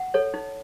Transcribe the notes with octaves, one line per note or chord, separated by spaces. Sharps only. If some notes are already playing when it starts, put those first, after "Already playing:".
Already playing: F#5
A4 C#5
D#4